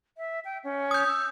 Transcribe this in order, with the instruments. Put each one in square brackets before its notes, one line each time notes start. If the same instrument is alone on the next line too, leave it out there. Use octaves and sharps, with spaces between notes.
[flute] E5
G5
C#4
[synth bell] D#6 G6
[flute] E6